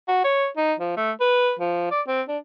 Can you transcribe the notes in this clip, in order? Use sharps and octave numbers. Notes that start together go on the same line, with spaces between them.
F#4
C#5
D#4
F3
A3
B4
F3
D5
C4
D4